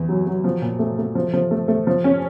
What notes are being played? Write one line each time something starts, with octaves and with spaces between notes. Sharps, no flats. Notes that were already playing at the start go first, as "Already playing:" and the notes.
Already playing: E2
F#3
F#3
F3
A#2
A3
A3
F3
F3
A3
A3
F3
C#4